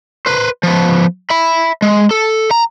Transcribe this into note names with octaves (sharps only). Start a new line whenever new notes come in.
B4 C5
F3 B3
E5 B5
G#3
A4
A#5